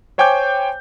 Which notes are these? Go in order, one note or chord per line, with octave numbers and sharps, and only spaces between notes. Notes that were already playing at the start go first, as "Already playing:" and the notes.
C5 C#5 G5 G#5 D6 G6